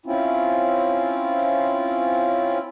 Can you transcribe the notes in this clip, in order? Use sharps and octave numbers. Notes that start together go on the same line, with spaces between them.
C4 C#4 E4 F4